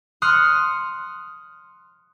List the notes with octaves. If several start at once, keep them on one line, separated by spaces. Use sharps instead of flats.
C6 D#6 F6 F#6 C#7